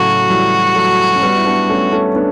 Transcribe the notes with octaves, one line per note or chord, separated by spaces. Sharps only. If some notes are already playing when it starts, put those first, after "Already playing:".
Already playing: A2 C#3 F#3 A3 F#4
E3 G3
F#3 A3
C#4
G3 B3
E4
B3 D4
A3 C#4
A3 C#4
B3 D4